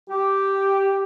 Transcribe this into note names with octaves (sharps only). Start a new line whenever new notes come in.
G4